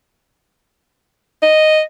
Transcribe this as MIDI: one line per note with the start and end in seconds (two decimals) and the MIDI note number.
1.42 1.81 75